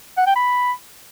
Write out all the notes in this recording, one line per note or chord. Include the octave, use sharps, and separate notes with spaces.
F#5
G5
B5